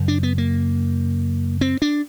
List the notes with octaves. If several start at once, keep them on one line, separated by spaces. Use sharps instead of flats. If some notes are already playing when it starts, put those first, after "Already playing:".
Already playing: F#2 C#3
D4
B3
A#3
C4
D4